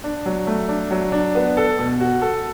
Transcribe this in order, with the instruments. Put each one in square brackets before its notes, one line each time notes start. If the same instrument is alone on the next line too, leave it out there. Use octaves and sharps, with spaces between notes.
[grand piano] D4
F#3
A3
D4
F#3
D4
B3
A4
B2
F#4
A4